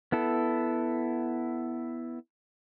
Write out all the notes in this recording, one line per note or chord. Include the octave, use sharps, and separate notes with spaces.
B3 E4 A4